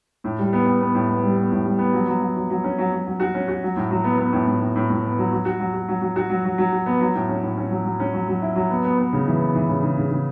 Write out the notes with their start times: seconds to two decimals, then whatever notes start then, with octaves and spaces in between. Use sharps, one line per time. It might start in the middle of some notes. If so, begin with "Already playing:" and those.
0.24 A2
0.38 G3
0.53 B3
0.66 B3
0.81 B3
0.94 A2
1.09 B3
1.23 G3
1.37 B3
1.51 A2
1.65 G3
1.79 B3
1.93 F#3
2.07 F#3
2.21 F#3
2.36 F#3
2.50 F#3
2.64 C#4
2.78 F#3
2.93 F#3
3.07 F#3
3.20 F#4
3.34 C#4
3.48 F#4
3.63 F#3
3.76 A2
3.91 F#3
4.04 B3
4.18 B3
4.33 A2
4.47 A2
4.61 A2
4.76 A2
4.90 A2
5.04 B3
5.18 F#3
5.32 F#3
5.45 F#4
5.60 F#3
5.73 F#4
5.88 F#3
6.02 F#3
6.16 F#4
6.30 F#3
6.45 F#3
6.58 F#3
6.72 F#4
6.86 B3
7.01 F#3
7.15 A2
7.29 C#4
7.43 A2
7.57 C#4
7.71 F#3
7.85 F#3
8.00 C#4
8.14 F#3
8.28 F#3
8.42 E4
8.56 F#3
8.70 B3
8.85 B3
8.98 B3
9.13 C#3
9.27 E3
9.40 B3
9.55 E3
9.69 C#3
9.83 C#3
9.98 C#3
10.11 C#3